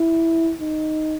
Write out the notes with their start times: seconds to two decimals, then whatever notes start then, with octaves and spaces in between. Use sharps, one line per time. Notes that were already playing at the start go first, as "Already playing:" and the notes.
Already playing: E4
0.60 D#4